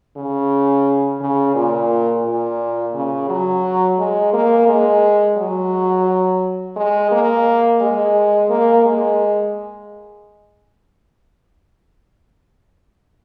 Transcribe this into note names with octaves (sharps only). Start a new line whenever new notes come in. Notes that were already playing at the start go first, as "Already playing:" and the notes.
C#3
C#3
A#2
A#2
C#3
F#3
G#3
A#3
G#3
F#3
G#3
A#3
G#3
A#3
G#3